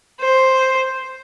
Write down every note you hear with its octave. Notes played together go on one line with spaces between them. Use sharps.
C5